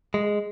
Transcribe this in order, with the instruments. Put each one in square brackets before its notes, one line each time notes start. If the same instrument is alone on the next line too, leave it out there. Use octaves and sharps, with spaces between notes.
[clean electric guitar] G#3